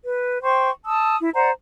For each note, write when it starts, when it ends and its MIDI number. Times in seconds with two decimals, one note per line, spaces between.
0.03 0.41 71
0.42 0.69 72
0.42 0.69 79
0.42 0.69 84
0.42 0.69 85
0.85 1.17 81
0.85 1.17 87
0.85 1.17 88
1.21 1.29 64
1.35 1.50 72
1.35 1.50 74
1.35 1.50 78
1.35 1.50 82